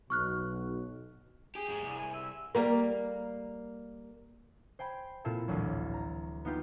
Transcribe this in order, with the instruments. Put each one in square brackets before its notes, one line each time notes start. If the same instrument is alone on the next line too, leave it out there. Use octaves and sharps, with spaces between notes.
[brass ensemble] B1 B2 [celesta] C#6 F6 F#6
[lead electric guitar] G4 [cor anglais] G#4
[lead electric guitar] G#2 G#3
C2
[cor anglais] G#5
E5
[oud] G3 A#3 A#4
[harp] C5 G5 G#5 B5
A#2 C4 E4 F4 A4
A1 D2 F#3
A#5
B3 D#4 F4 G4 B4